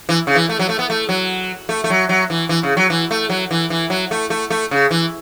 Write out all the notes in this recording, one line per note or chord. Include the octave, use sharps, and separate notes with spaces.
E3
C#3
E3
A3
F#3
A3
B3
A3
F#3
A3
A3
F#3
F#3
E3
E3
C#3
F#3
E3
A3
F#3
E3
E3
F#3
A3
A3
A3
C#3
E3